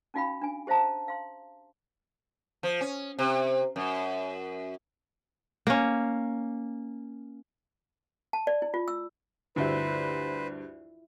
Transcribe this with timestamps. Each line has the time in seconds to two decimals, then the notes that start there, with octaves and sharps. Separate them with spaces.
0.14 C#4 D#4 F#4 F5 G5 B5
0.42 D4 G#5
0.67 G4 C5 E5 F5 A5 A#5
1.08 F5 C6
2.63 F3
2.81 C#4
3.19 C3
3.76 F#2
5.67 A#3 C#4
8.33 A5
8.47 D5
8.62 E4
8.74 F4
8.88 E6
9.56 D2 G2 E4 F4 B4 C5 E5